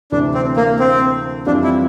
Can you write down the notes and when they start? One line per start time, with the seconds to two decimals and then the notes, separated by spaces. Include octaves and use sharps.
0.12 D2 C3 E3 D4
0.34 C4
0.57 A#3
0.79 C4
1.46 F2 E3 G3 C4 D4 F4
1.64 E4